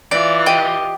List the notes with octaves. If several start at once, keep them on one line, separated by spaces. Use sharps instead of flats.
E3 F4 D5
G4 D#5